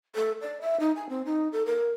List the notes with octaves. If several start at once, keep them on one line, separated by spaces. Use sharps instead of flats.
A4
D5
E5
D#4
G#5
C4
D#4
A4
A#4